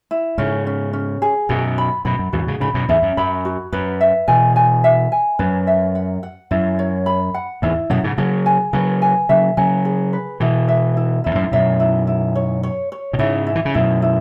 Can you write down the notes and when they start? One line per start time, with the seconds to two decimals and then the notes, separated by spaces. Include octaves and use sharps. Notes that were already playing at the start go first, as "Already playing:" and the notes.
0.11 E4
0.38 G#2 C#3 C#4
0.67 C#4
0.93 C#4
1.22 G#4
1.49 F#2 B2 F#4
1.78 B5
2.05 F#2 B2 B5
2.19 F#2
2.33 E2 G#2 F#4
2.47 G#2 C#3
2.60 G#2 C#3 B5
2.74 F#2 B2
2.89 E2 G#2 E5
3.02 F#2
3.17 F#2 B5
3.45 F#4
3.72 F#2 B4
4.01 E5
4.28 B2 E3 G#5
4.56 G#5
4.84 E5
5.12 G#5
5.39 F#2 B4
5.67 E5
5.95 F#5
6.23 F#5
6.51 F#2 E4
6.79 C#5
7.06 B5
7.34 F#5
7.62 E2 G#2 E4
7.90 F#2 B2 F#5
8.04 G#2 C#3
8.18 C#3 F#3 G#4
8.46 G#5
8.73 C#3 F#3 B4
9.02 G#5
9.29 C#3 F#3 E5
9.57 C#3 F#3 G#5
9.85 G#4
10.13 B4
10.40 B2 E3 E4
10.68 E5
10.97 E4
11.24 E2 E4
11.35 F#2
11.43 G#2
11.52 F#2 B2 E5
11.80 E4
12.07 E4
12.36 C#5
12.63 C#5
12.92 C#5
13.13 B2
13.19 G#2 C#3 E4
13.47 E4
13.55 E3
13.65 C#3
13.74 F#2 B2 E4
14.02 E4